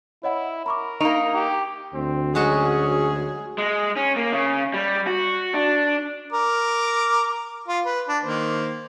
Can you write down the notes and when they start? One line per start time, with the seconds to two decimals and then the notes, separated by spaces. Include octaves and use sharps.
0.23 E4 C#5 D#5 F#5
0.66 A#4 B5 C#6 D6
1.01 A#3 D#4 C#6 D7 F7
1.34 G4
1.94 D2 C4
2.35 F#3 G#3 C#4 F#4 G#4
3.58 G#3
3.96 C#4
4.16 A#3
4.32 C#3
4.74 G3
5.07 F#4
5.54 D4
6.33 A#4 D6
7.68 F4
7.85 B4
8.09 D4
8.24 D#3 A#3 C5